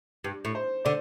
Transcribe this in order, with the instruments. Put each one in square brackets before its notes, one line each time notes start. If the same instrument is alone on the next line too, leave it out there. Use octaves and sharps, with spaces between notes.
[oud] G2
A2
[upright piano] C5
[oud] D3 [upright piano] D5